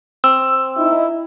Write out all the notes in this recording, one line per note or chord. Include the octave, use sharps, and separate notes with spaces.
C4 E6
D#4 E4